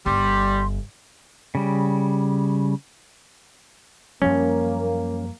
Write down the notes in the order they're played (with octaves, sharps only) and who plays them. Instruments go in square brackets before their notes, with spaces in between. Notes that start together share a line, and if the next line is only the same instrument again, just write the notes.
[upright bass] G1 [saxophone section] G3 [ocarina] C6
[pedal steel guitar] C#3 G3
[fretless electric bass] F#2 F3 G3 [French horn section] A#3 [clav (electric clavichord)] C#4